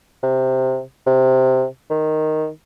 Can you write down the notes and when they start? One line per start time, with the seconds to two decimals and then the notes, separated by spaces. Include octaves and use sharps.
0.23 C3
1.06 C3
1.90 D#3